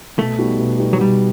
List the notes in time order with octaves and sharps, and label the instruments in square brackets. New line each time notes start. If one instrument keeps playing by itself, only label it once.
[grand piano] B2 [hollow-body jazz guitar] A3
[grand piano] G3 B3 D#4 F#4
B2
G3 B3 D#4 F#4
[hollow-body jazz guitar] F#3
[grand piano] B2 [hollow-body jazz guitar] G3